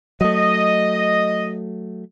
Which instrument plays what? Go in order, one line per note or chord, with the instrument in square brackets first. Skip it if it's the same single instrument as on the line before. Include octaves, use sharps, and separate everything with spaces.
[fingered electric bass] F#3 A3 [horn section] D#5